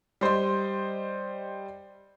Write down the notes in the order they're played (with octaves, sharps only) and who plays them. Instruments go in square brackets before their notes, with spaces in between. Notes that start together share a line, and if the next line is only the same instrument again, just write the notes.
[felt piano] G3 C5 D#5 C6